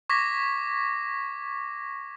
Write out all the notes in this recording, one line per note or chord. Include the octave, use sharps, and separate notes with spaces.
C#6 D6 G#6 A#6 B6